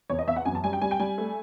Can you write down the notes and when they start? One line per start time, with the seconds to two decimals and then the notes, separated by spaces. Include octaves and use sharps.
0.10 E2 C#5
0.19 D#5
0.28 E2 E5
0.36 F#5
0.45 F#2 G#5
0.55 A5
0.64 G3 G#5
0.73 G5
0.82 G3 G#5
0.91 G5
1.00 G3 G#5
1.18 A3